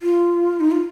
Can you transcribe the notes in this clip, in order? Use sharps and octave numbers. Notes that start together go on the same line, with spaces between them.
F4
D#4
F4